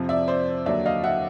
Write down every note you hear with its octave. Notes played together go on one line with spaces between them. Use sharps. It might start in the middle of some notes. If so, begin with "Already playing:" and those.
Already playing: F2 C3 F3
D5 E5
C5 D5
D#2 D3 F#3 D5 E5
D#5 F5
E5 F#5